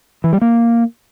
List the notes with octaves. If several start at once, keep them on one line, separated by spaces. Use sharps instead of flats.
E3
G3
A#3